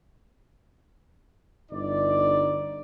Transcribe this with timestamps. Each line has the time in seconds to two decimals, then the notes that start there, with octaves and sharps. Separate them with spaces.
1.72 G1 D#4 D5